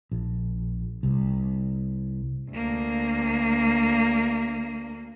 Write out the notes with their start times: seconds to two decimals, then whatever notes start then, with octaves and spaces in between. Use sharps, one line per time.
0.11 A#1
1.03 C2
2.51 D2 A#3